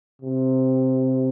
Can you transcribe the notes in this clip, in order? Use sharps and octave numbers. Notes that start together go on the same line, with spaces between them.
C3